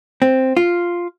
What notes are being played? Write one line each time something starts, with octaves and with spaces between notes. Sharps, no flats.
C4
F4